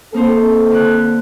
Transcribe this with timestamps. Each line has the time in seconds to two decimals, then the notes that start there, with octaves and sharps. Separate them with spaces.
0.14 A#3 C4 D#4 A4 C5
0.71 D3 F#6